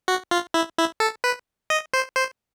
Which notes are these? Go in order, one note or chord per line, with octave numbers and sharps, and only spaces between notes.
F#4
F4
E4
E4
A4
B4
D#5
C5
C5